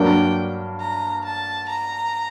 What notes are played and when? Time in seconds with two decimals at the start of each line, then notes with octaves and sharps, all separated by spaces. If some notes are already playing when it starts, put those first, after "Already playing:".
Already playing: G2 F#3 A#3 D4 G5
0.80 A#5
1.24 A5
1.68 A#5